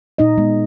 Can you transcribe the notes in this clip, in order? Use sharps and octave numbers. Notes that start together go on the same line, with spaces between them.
A#2 D#4 D#5
G#3 B3